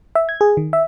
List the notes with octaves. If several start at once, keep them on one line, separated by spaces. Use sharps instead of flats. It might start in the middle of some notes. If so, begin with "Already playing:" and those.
E5
G#6
G#4
D#3
E5